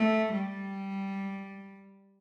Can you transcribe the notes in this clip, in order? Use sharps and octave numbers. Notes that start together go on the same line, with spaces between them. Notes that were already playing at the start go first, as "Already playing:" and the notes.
Already playing: A3
G3